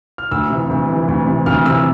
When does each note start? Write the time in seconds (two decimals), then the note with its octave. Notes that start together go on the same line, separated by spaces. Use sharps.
0.18 F6
0.31 D2 E6
0.50 C3 E3
0.70 D2
0.89 C3 E3
1.08 D2
1.27 C3 E3
1.46 D2 F6
1.65 C3 E3 E6